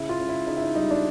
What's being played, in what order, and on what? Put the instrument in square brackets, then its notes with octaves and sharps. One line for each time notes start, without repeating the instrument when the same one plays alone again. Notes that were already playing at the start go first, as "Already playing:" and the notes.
Already playing: [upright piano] C#3 E4
F4
C#3
E4
C#3 D#4
E4
D#4
G3 D#4
D4